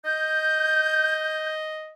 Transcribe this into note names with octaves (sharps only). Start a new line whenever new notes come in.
D#5 G6